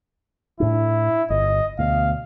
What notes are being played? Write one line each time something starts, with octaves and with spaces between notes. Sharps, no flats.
A2 D4 E4
G1 D#5
D2 B2 F5